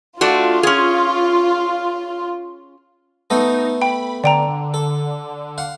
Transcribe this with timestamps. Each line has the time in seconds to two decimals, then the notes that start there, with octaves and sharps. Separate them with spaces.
0.21 A3 D4 F4 F#4
0.63 C#4 G#4
3.30 A3 B3 D#4 A4
3.82 G5 B5
4.24 D3 D5 G5 A#5
4.74 A4
5.58 F5 F#5